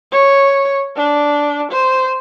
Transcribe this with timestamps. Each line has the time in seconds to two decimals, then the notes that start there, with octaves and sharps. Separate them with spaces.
0.12 C#5
0.97 D4
1.71 C5